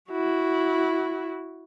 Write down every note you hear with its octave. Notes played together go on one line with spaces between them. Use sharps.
E4 F#4